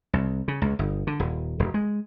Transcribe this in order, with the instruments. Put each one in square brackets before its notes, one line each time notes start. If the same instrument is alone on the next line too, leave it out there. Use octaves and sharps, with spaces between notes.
[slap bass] C2
C#3
C#2
G1
D3
D#1
E1
G#3